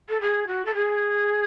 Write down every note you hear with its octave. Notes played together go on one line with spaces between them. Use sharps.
A4
G#4
F#4
A4
G#4